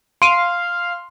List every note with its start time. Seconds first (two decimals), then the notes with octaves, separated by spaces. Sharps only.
0.22 F5 C6 D7 D#7